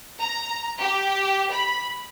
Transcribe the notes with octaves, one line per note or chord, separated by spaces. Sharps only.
A#5
G4
B5